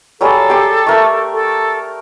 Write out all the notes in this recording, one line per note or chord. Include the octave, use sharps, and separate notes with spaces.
F#3 G3 G#4 A4
G4 C6 D6
A3 A#4 C#6
A4